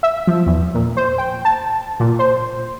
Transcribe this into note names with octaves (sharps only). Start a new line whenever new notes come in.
E5
F3
E2
A#2
C5
G5
A5
A#2
C5